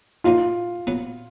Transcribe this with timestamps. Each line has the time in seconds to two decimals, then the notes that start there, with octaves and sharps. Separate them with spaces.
0.24 A#2 F#3 A#3 D#4 F4
0.87 A#2 F#3 B3